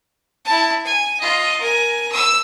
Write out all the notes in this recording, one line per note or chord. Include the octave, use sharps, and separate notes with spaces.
E4 A5
G#5
F4 D#5
A#4 G#5
E6